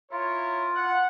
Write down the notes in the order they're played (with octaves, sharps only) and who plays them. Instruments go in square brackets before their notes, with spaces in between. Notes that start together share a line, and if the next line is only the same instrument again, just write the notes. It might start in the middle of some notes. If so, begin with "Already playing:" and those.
[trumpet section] E4 A#4 C#5 [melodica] F4
[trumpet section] F#5